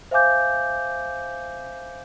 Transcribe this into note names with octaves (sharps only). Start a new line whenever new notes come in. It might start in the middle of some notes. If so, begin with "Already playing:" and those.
C5 E5 F5 G#5 D6 G6